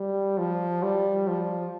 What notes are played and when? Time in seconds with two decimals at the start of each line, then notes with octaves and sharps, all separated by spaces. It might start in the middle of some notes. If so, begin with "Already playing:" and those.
Already playing: G3
0.38 F3
0.83 G3
1.28 F3